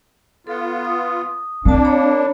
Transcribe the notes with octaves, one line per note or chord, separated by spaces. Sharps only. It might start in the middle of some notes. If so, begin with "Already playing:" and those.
B3 F4 A4
D#6
A3 A#3 C4 D4 A5
C#5 A#5 B5